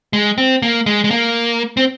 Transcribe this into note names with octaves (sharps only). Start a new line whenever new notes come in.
G#3
C4
A#3
G#3
G#3
A#3
C4